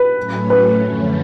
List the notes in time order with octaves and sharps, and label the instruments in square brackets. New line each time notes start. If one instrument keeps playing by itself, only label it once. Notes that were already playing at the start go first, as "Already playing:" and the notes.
Already playing: [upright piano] B4
[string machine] A2 F#3 A3 C#4
[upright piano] B4
[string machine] F#2 D3 F3 A3 C#4